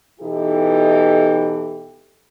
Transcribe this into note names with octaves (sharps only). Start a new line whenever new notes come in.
B2 E3 D#4 E4 G4 A4